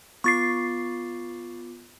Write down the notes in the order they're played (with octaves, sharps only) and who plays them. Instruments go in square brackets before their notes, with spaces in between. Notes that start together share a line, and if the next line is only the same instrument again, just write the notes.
[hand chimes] B3 F4 D6 [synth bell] C#6 A6 C7